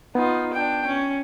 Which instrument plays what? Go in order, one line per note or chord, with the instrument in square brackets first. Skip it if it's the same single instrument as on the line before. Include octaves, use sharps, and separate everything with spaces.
[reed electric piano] B3 [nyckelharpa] D#4 F4
[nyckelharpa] D4 G5
C#4